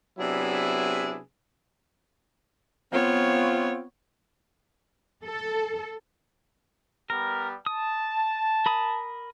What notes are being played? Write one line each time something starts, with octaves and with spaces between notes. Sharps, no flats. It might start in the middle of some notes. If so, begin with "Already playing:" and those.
C3 F#3 B3 D4 E4 G#4
B3 C4 F4 C#5
A4
G3 B3 A#4
A5 D#6
A#4 B5 D#6